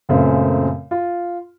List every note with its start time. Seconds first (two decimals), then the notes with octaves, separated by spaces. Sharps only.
0.09 C#2 F#2 A#2 C#3 A3 C4
0.91 F4